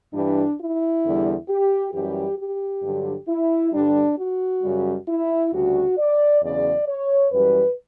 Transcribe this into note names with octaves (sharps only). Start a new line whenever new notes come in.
G2 E3 G3 D4
E4
E2 D3 G3
G4
F#2 E3 G3 G4
G4
G2 D3 F#3
E4
G2 D3 G3 D4
F#4
F#2 C#3 G3
E4
D2 C#3 G3 F#4
D5
E2 C#3 F#3 D5
C#5
F#2 E3 G3 B4